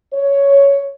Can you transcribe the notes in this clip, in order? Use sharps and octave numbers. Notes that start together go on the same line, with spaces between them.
C#5